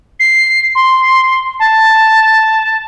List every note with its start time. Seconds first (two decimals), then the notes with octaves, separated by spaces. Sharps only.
0.20 C7
0.75 C6
1.59 A5